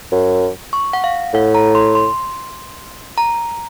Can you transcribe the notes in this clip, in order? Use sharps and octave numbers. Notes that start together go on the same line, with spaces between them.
F#2
C#6
F#5
F5
A2 F#5
A#5
C6
C6
A#5